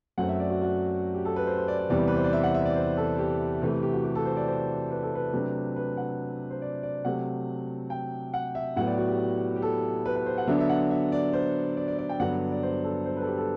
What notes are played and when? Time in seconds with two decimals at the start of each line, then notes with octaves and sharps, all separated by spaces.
0.18 F#2 F#3 A3 C4 F#5
0.29 E5
0.40 D5
0.50 F#4
0.62 F#4
1.14 G4
1.25 A4
1.36 B4
1.47 C5
1.58 C5
1.68 D5
1.79 D5
1.90 E2 C3 E3 G3 B3 D5
2.08 B4
2.16 C5
2.24 D5
2.33 E5
2.43 F#5
2.54 E5
2.65 D5
2.76 C5
2.97 A4
3.18 G4
3.62 C3 E3 A3 G4
3.72 G4
3.83 G4
3.93 F#4
4.04 G4
4.15 A4
4.25 C5
4.37 D5
4.48 C5
4.90 B4
5.03 A4
5.15 B4
5.33 C3 F#3 A3 D4
5.76 B4
5.97 F#5
6.50 C5
6.62 D5
6.83 D5
7.05 C3 F#3 A3 F#5
7.90 G5
8.34 F#5
8.55 E5
8.76 A2 F#3 B3 F#5
8.87 D5
8.98 F#4
9.09 G4
9.56 G4
9.62 A4
10.06 B4
10.16 B4
10.26 C5
10.38 F#5
10.47 D3 F#3 B3 D4 E5
10.60 E5
10.69 F#5
10.91 E5
11.12 D5
11.33 C5
11.77 D5
11.88 D5
11.98 D5
12.09 G5
12.20 G2 D3 F#3 B3 D4 F#5
12.52 D5
12.63 C5
12.84 A4
13.06 C5
13.17 B4
13.21 A4
13.27 G4
13.38 A4